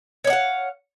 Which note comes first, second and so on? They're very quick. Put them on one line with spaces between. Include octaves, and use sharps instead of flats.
C#5 D5 F#5 F5